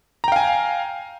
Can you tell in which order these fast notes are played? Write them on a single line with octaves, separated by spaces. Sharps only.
A#5 G5 F5 G#5